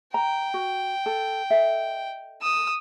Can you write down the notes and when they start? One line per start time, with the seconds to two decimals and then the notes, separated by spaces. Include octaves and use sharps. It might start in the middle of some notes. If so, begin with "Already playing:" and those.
0.14 G5 A#5
0.54 F#4
1.06 A4
1.50 A4 D#5 E5
2.42 D#6 E6